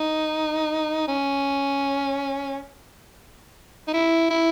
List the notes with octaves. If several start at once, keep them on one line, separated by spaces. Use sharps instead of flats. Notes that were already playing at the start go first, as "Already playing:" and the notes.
Already playing: D#4
C#4
D#4
E4
E4